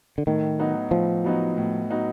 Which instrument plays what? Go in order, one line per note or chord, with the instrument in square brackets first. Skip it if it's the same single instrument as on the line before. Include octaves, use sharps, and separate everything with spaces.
[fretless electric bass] D3
[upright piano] A2 [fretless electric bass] D#3
[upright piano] F#3 B3 D#4 F#4
[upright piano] A2 [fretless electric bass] F3
[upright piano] F#3 B3 D#4 F#4
A2
F#3 B3 D#4 F#4